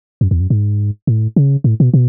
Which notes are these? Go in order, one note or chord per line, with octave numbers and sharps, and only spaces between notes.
F#2
E2
F#2
G#2
A2
C#3
A2
B2
B2